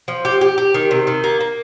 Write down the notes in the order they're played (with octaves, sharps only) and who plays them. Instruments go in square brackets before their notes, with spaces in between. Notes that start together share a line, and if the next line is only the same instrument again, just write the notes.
[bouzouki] F3
G4
G4
G4
D#3
C3
D#3
A#3
A#3